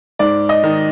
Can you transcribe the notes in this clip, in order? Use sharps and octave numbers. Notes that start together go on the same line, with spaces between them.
G#2 D5
D#5
D#3